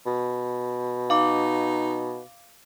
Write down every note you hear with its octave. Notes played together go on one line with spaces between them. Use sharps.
B2
D#4 F5 D6